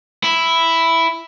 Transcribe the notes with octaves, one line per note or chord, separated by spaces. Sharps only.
E4